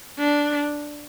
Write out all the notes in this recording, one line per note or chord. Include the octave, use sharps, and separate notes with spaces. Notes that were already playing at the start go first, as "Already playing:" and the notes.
D4